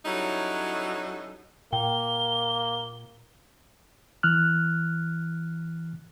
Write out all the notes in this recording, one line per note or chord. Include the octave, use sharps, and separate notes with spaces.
F#3 G3 C#4 D#4 E4 A4
A#2 A#3 G5 G7
E3 F6 F#6